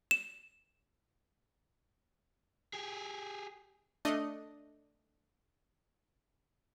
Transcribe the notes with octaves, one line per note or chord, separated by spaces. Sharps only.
E7
G4 G#4
A3 D4 D#5